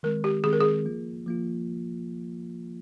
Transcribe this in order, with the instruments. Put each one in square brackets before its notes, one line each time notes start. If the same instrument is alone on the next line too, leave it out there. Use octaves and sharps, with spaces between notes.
[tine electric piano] D#3 G#3 C4 [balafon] A#4
[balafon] G4
[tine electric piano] D#3 G#3 C4 [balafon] G#4
[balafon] A#4
G#4
[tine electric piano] F3 A#3 F4
F3 A#3 F4